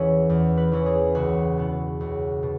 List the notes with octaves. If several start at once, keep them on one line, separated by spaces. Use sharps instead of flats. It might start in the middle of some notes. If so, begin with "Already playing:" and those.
Already playing: E2 E3 C#4 E4 G#4
E2
B4
E3 C#4 E4
G#4
C#2 F#4
B2 B3 E4
C#2
B2